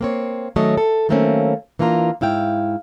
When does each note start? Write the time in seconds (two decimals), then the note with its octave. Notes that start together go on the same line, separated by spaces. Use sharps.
0.01 A#3 C4 C#5
0.56 D#3 F#3 A3 C#4 C#5 D#5
0.77 A4
1.09 D#3 F#3 A3 A#3 C4 C#4
1.79 E3 A#3 D4 F4 A#5
2.21 G#2 E4 F5 G5